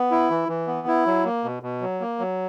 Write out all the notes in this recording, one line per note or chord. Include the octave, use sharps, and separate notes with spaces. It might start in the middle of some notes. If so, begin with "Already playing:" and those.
Already playing: B3
E4
E3
E3
B3
E4
F#3
A#3
B2
B2
F#3
A#3
F#3